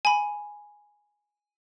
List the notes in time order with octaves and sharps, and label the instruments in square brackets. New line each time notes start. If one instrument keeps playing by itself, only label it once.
[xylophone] G#5 B5